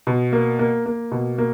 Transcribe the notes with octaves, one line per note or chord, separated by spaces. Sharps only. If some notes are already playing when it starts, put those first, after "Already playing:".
B2
A#3
A#3
A#3
B2
A#3